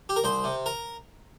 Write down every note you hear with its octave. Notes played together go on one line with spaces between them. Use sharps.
G4
A#4
C2 C5
C3
A#4